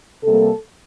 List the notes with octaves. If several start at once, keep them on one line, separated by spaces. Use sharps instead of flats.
C3 G3 A#3 A4